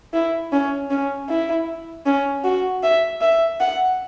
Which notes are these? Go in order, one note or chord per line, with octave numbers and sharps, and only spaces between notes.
E4
C#4
C#4
E4
C#4
F#4
E5
E5
F#5